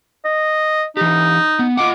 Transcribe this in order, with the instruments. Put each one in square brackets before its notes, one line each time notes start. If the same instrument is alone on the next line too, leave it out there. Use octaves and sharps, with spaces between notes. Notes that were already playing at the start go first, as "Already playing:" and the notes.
[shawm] D#5
[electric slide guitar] E3 G4 [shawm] D#4
[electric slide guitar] B3
[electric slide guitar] F4 D#5 F#5 [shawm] D6